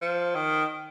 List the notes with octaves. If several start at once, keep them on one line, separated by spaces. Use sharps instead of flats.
F3
D#3